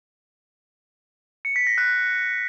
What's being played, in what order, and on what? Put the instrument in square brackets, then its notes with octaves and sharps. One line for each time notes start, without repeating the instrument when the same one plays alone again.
[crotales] C#7
B6
A#6
F#6